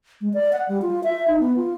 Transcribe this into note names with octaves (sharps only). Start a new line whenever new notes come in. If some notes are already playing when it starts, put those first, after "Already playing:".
G#3
D5
F#5
G3
F4
E5
D#4
B3
F4